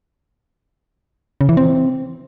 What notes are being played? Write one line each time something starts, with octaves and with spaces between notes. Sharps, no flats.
C#3
E3
C4